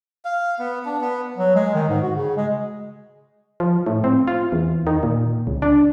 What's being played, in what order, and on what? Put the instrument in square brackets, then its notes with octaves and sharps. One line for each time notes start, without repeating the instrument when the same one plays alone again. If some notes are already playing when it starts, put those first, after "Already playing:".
[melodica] F5
B3
D4
B3
[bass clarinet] F#3
G#3
D#3
G#2
F#4
C#3
G#3
[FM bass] F3
A2
C4
F4
E2
D#3
A#2
C#2
D4